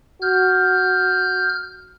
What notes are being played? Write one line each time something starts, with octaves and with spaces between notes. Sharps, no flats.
F#4 F6 G6